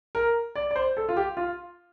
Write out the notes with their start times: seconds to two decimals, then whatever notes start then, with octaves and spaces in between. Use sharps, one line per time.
0.15 A#4
0.55 D5
0.71 D5
0.76 C5
0.97 A4
1.09 F4
1.17 G4
1.37 F4